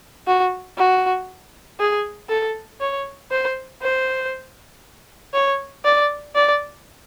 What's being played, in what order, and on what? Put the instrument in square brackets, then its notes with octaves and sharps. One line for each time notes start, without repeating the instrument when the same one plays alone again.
[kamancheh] F#4
F#4
G#4
A4
C#5
C5
C5
C#5
D5
D5